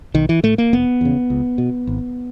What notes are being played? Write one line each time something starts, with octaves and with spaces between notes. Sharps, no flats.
B1 D#3
E3
A2 A3
A#3
F1 B3
E2 C#3
C#2
B2
G#1